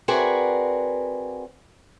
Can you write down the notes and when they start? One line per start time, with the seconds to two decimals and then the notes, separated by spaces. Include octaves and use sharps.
0.08 C4 F#4 G#4 A#4 B4 D5